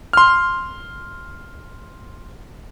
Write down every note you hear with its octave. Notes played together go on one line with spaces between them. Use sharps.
C6 F6